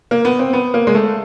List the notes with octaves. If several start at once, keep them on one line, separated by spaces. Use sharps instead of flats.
A#3
B3
C4
B3
A#3
G#3
A3